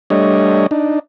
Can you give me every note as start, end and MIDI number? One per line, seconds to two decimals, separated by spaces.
0.10 0.67 55
0.10 0.67 57
0.10 0.67 62
0.10 0.67 73
0.10 0.67 75
0.71 0.99 62
0.71 0.99 63